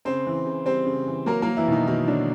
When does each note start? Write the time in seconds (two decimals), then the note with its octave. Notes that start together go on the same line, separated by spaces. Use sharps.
0.05 C#3 C4 C5
0.26 E3
0.46 C#3
0.66 G3 C4 C5
0.86 C#3
1.07 E3
1.26 F#3 A#3 A#4
1.42 F#3 A#3 A#4
1.57 E3 E4
1.68 B2 D#3 D#4
1.87 B2 D#3 D#4
2.07 D3 F#3 D4